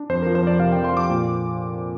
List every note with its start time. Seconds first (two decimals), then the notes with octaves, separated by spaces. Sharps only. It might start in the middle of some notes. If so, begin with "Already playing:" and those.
Already playing: D4
0.09 F2 C5
0.22 F3 A#4
0.35 C5
0.43 F2 D5
0.59 C3 F5
0.72 F2 G5
0.84 C6
0.93 F3 D6
1.09 A#2